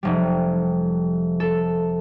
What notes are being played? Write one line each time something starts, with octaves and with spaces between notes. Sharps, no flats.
F1 G3
A4